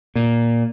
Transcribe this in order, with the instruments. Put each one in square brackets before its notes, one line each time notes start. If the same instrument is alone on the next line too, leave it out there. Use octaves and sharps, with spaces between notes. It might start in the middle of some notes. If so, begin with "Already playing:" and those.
[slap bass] A#2